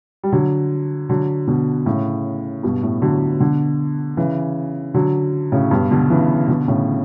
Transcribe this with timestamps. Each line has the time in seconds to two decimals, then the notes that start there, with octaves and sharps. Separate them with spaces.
0.23 G3
0.32 D3 F#3
1.09 D3 F#3
1.48 B2 D3
1.86 A2 C#3
2.63 G2 B2
2.83 A2
3.02 D3 F#3
3.40 B2 D3
4.17 C#3 E3
4.94 D3 F#3
5.52 A2 C#3
5.71 G2 B2
5.91 B2 D3
6.10 C#3 E3
6.48 B2 D3
6.68 A2 C#3